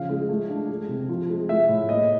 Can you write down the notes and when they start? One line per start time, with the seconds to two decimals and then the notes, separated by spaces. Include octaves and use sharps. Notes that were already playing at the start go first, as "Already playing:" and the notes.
Already playing: C#3 F3 F5
0.09 G#3
0.29 A3
0.49 D4
0.69 G#3
0.89 C3
1.09 F3
1.29 G#3
1.49 A3 E5
1.69 A2
1.89 A#3 D#5